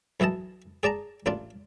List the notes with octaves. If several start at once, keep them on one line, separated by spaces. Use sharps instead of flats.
B1 E3 E4 D#5 A5
G#4 D5 A5 A#5
A1 D4 F4 D5